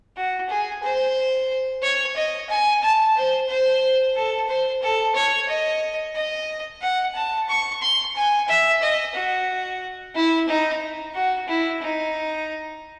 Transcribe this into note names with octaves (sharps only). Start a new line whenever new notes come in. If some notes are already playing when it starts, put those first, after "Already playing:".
F#4
G#4
C5
C#5
D#5
G#5
A5
C5
C5
A4
C5
A4
C#5
D#5
D#5
F#5
A5
C#6
C6
G#5
E5
D#5
F#4
E4
D#4
F#4
E4
D#4